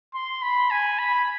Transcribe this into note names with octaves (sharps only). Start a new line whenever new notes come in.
C6
B5
G#5
B5